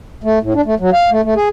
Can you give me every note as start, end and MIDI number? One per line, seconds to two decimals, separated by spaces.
0.24 0.39 57
0.42 0.53 45
0.54 0.61 62
0.66 0.75 57
0.80 0.90 54
0.93 1.10 77
1.11 1.21 57
1.24 1.34 57
1.36 1.49 68